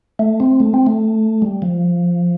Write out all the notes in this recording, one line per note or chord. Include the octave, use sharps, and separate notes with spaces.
A3
C4
A3
C4
A3
G3
F3